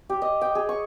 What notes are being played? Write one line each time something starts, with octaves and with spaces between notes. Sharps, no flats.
G4
D#5
G5
G#4
C#6